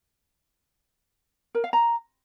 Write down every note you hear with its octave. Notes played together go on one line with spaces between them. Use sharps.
A#4
F5
A#5